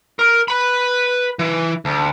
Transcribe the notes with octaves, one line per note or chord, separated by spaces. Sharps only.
A#4
B4 B5
E3
D2